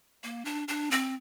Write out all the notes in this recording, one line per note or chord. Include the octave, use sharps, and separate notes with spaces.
A#3
D4
D4
C4